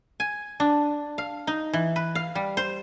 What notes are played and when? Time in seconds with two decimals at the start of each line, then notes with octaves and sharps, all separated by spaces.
0.20 G#5
0.60 D4
1.18 F5
1.47 D#4
1.73 E3
1.96 B4
2.15 F5
2.35 G3
2.57 C5